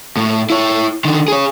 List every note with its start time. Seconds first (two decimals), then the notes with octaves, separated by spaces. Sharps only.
0.17 A2
0.50 E4 C#5
1.05 D3 D#3
1.28 G#4 C#5